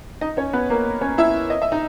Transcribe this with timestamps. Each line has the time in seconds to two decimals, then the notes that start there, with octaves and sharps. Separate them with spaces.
0.21 D#4 D#5
0.37 C#4 C#5
0.53 B3 B4
0.70 A#3 A#4
1.02 C#4 C#5
1.18 E4 E5
1.50 D#5
1.62 E5
1.72 D#4 D#5